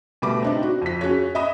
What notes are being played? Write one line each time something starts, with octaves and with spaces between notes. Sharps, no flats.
B2 G3 A3 B5 D6
C4 D4 D#4
F#4
F2 B6
C#4 F#4 G#4 C#5
D#5 E5 B5 D#6